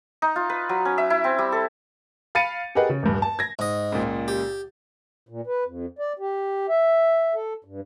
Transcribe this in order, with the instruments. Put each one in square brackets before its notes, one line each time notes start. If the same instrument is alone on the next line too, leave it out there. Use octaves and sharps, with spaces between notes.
[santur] D#4
F4
B4
F#3
C#4
E5
E4
C4
G3
A4
[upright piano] F5 B5 A6 C#7 D#7
G4 G#4 A#4 B4 D#5 F#5
C#3
D#1 G2
A5
G#6 A#6
[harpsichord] G#2 D#5
[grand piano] C#2 A#2
[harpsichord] G4
[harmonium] A#2
B4
F2
D5
G4
E5
A4
G2